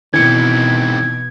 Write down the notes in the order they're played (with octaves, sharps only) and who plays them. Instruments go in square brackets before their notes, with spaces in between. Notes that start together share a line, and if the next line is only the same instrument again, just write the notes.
[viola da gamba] B2 [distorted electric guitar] D#3 C4 [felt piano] E3 C#7 [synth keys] G#6